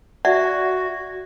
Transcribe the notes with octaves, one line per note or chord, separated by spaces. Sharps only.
F#4 D5 E5 F#5